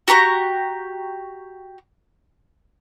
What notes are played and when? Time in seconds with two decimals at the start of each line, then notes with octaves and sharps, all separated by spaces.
0.08 F#4 G4 A#5 C#6